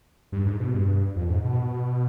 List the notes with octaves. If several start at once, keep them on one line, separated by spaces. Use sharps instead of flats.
G2
G#2
B2
G2
F2
G#2
B2